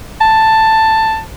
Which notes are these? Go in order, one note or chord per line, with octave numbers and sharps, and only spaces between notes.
A5